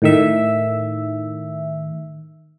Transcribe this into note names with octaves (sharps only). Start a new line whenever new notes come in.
A2 D#3 E5